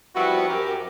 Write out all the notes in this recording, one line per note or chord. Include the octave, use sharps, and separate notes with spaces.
F3 G3 B3 C4 E4 F#4
F#2 G4 A#4